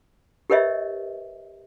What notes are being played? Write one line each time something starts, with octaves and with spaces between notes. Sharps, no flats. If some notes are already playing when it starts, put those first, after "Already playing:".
G4 A#4 B4 C#5 D#5 E5